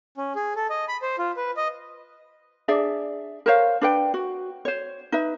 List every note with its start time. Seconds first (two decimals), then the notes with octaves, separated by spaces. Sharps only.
0.17 C#4
0.35 G#4
0.56 A4
0.70 D#5
0.88 B5
1.02 C5
1.19 F4
1.37 B4
1.57 D#5
2.68 D4 G#4 D5 E5
3.46 A#4 C5 C#5 F5
3.81 D4 B4 G5
4.14 F#4
4.65 C5 C#5
5.12 D#4 B4 E5